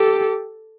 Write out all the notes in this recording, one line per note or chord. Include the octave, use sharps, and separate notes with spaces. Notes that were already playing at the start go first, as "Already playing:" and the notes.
Already playing: G4 A4